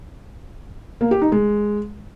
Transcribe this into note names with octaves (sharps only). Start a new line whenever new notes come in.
A#3
G4
D#4
G#3